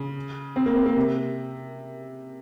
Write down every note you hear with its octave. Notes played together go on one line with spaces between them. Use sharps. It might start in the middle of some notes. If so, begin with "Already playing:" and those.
Already playing: C#3
C4
A#3
C4
A#3
C3